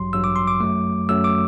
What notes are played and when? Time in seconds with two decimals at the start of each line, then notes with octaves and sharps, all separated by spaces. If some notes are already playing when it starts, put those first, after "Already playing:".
Already playing: A1 G2 F#3 C6
0.13 A1 G2 F#3 E6
0.24 D6
0.36 C6
0.48 D6
0.60 F#2 F#3 A3
1.09 F#2 F#3 A3 E6
1.24 D6